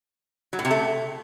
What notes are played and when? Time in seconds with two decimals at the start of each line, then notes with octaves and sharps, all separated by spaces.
0.53 F#3
0.59 A2
0.65 C3
0.71 A3